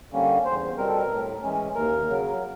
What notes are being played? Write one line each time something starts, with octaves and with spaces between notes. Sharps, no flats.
D3 G3 A#3 C#4
E2 C5
B2 G3 C4 A#4
A4
A#4
A2
E3 G#3 C#4
D#2 A#4
C#3 F#3